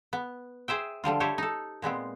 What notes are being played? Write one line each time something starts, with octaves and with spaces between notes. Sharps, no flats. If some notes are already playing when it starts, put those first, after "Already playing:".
B3
G#4 C5 E5 G5
D3 F3 G3 F4
E4 G4 A4 C5 C#5
D#4 A4
A#2 G#3 B3 C4